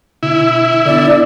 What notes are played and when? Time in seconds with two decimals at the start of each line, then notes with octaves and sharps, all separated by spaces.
0.23 B2 D3 E4
0.86 D3 B3 D5